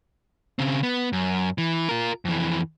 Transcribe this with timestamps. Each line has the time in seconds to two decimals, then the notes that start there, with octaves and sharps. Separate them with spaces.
0.59 C#3 C4
0.83 B3
1.13 F#2
1.58 E3
1.89 F4 A#4
2.25 F2 E3